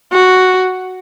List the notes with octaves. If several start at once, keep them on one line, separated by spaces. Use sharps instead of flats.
F#4